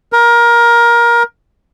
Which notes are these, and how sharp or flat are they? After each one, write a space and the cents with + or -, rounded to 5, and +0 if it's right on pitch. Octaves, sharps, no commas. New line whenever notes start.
A#4 +20